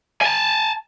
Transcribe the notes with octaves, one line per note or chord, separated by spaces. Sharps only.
G#5 A5